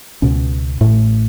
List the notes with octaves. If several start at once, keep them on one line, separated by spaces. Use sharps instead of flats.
C#2 B2 C#4
A1 A2 A3